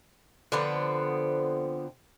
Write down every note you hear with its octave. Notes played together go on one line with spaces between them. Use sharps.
D3 F3 B3 C4